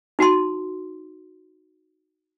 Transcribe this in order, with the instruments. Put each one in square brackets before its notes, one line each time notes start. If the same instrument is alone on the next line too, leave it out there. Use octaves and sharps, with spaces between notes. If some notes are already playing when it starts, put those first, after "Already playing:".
[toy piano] D#4 F#4 A5 C6